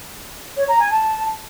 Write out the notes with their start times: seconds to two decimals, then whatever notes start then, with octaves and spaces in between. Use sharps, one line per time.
0.57 C#5
0.68 A#5
0.79 G#5
0.91 A5